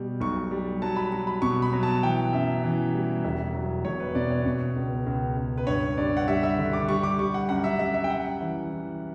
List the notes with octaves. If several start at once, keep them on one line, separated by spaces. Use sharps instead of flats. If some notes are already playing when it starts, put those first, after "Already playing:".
Already playing: B2 G3
B1 C#6
G3
F#3 A5
B5
F#3
B5
B2 C#6
B5
F#3
A5
E3 G5
F#2 E5
E3
G3
E1 E5
F#3
E1 C#5
B4
B2 D5
C#5
B2
C#2
C#2
C#2
B4
G2 C#5
G2 D5
F#5
G3 E5
E5
D3
D6
G3 C#6
D6
G3 C#6
F#5
F#2 F#5
E5
G3 E5
E5
G5
F#2 F#5
E3
E3